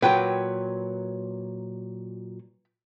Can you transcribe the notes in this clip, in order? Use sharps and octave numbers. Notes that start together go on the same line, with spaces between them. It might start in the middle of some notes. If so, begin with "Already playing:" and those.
A#2 F#3 B4 G5